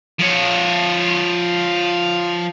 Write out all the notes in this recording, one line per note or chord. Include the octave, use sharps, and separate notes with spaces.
F3 C#5